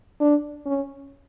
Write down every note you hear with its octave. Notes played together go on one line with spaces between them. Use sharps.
D4
C#4